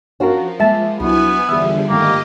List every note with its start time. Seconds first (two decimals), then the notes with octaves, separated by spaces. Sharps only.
0.20 F3 C#4 D4 F4 F#4 A#4
0.60 G#3 A#3 E5 A5
1.00 C2 F#3 B3 D4 E4 B4 G#5
1.49 E2 D3 F3 G3 G#4 E5
1.89 G#2 D#3 A3 A#3 G4 D#5